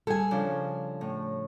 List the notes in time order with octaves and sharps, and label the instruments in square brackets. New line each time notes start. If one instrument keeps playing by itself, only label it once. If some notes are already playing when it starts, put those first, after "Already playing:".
[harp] G3 G#4 [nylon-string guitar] A4 G#5
[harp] C#3 F3 D4
A2